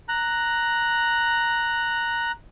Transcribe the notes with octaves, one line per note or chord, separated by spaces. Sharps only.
A#5 F#6